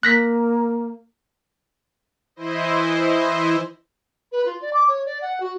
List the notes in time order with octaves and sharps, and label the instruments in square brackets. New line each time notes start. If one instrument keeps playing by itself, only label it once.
[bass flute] A#3 [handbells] F#6 A#6 B6
[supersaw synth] E3 E4 C5 D#5
[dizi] B4
F4
D5
D6
C#5
D5
F#5
F#4